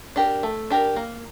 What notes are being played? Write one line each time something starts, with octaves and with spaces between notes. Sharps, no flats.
D4 G4 A#4
A3
D4 G4 A#4
A#3